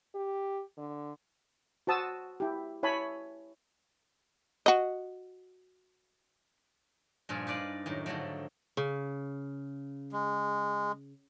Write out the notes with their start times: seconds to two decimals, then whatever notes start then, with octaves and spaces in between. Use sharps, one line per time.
0.15 G4
0.77 D3
1.87 F#4 C5 A5 D#6 E6
2.40 E4 G4
2.83 E4 C#5 G#5 A5 B5
4.66 F#4 D#5
7.29 G2 A#2 F3 F4 G#5
7.47 D#4 B4 D5 F5
7.86 F#2 A2 D#3
8.06 G#2 D3 F3 F#3 A3
8.77 C#3
10.12 G#3